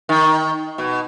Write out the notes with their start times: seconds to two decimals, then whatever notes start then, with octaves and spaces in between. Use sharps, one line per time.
0.09 D#3
0.78 B2